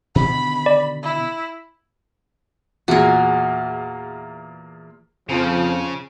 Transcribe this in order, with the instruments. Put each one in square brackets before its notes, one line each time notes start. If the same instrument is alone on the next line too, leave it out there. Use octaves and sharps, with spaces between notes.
[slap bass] B2 D3 D#3 [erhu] B5
[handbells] D5
[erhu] E4
[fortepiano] E2 A#2 [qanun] F#4 G#4
[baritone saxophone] F2 [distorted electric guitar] C#3 [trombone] F3